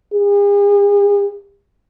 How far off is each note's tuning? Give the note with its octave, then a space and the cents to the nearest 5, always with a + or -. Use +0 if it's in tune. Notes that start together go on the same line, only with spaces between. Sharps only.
G#4 -45